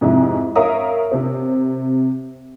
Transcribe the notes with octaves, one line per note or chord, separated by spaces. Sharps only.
F2 G#2 C3 E4
A#4 C#5 E5 F5 A#5 D#6
C3 C4